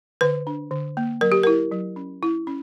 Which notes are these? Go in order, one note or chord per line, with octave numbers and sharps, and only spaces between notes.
D3 B4
D4
D3
A#3
F#3 A#4
G4
E4 A#4
F#3
C#4
E4
C#4